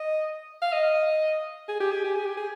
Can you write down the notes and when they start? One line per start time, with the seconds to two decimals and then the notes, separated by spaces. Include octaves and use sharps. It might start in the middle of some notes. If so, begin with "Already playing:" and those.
Already playing: D#5
0.62 F5
0.72 D#5
1.68 G#4
1.80 G4
1.92 G#4
2.04 G4
2.15 G#4
2.26 G4
2.37 G#4